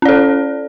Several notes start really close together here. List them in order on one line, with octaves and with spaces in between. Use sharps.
C#4 D5 A4